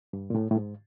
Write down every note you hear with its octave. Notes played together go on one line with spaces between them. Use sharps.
G2
A#2
A2
A2
G#2